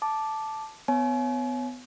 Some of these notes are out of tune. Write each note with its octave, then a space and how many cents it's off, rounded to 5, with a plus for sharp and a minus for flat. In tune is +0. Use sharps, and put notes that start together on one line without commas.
A5 -5 D6 +5
B3 +25 C#5 +0 G#5 +40